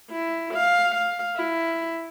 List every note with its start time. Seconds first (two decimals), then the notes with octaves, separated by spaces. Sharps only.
0.11 E4
0.54 F5
0.94 F5
1.36 E4